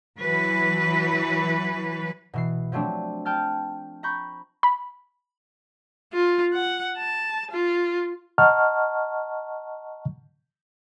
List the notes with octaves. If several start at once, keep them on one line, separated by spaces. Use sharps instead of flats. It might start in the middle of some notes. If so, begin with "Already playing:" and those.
E3 F#3 B4
B2 E3 C7
F3 F#3 A3 C4 D4
G5 A5 F6 A6
A#5 B5 C#6 G6
B5
F4
F#5
A5
F4
D#5 F#5 A5 A#5 C#6 F6